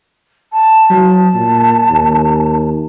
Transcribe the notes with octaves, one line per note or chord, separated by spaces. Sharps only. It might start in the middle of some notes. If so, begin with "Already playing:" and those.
A5
F#3 A5
A#2
D#2